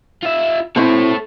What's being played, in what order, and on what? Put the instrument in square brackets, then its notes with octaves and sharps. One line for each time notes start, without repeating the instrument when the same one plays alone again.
[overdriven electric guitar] F4 E5
[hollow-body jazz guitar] B2 C4 E4 [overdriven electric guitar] A4 C#5